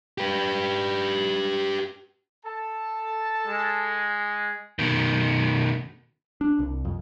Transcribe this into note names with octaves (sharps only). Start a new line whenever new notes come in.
G4 B4
A4 A5
G#3
B2 D#3
D4
C2
F2